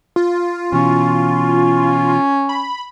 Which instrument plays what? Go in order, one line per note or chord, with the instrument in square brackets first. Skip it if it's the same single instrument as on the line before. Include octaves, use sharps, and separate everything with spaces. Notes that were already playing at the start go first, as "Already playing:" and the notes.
[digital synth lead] F4
[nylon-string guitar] B2 E3 [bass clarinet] C#4
[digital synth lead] B5